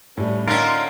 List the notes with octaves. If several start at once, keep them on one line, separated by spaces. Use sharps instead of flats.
A2 G3 C#4 D4 B4
D3 A#3 C#4 D#4 F4 A#4 D5 A6